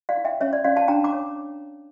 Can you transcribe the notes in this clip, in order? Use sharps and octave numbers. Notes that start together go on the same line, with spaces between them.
D5 F5
E4
E5 G5
C#4 C#5 E5
D5
C#4 D5 F5
F5 A5
D4 G5 A#5
A#5 D6
C#5